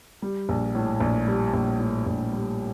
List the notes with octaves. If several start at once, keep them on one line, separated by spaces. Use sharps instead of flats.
G3
A#1
A2
A#1
G3
A#1
A2
A#1
G3